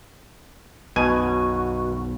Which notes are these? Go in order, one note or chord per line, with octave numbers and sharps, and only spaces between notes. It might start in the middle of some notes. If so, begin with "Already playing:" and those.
B1 F#2 B2 F#4 G#5